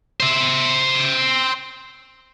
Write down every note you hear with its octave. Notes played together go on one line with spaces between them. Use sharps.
C5 E5